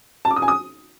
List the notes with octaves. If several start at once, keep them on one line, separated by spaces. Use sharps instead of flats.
A5
D6
D#6
G#5
D#6